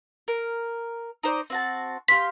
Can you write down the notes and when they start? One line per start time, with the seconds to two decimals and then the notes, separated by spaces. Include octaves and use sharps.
0.28 A#4
1.23 D#4 C5 D5
1.50 C4 F#4 A5
2.08 G4 F5 C6 B6